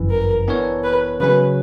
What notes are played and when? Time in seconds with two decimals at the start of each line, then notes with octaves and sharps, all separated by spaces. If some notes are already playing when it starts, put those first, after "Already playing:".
Already playing: G1 F#2 E3
0.11 A#4
0.47 E3 B3 D4 A#4 C#5
0.84 B4
1.20 C#3 F#3 C#4 B4